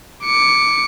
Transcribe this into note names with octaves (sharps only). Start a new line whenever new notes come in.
D6 C#7